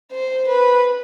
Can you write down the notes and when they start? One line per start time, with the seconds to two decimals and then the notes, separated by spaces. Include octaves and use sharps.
0.11 C5
0.48 B4